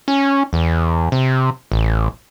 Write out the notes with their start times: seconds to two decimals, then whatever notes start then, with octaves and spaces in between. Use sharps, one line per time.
0.08 C#4
0.53 E2
1.12 C3
1.72 A1